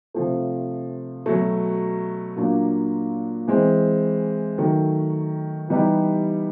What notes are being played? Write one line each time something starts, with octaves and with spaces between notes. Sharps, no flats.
C3 F3 A3
B2 F#3 A3
A#2 F#3 A#3 D4 F4
E3 G#3 C4
D#3 F#3 A3
E3 G3 B3 D#4 G4